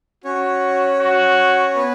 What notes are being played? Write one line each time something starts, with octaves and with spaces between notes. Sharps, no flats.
C#4 F#4 C#5
F#4
B3 B4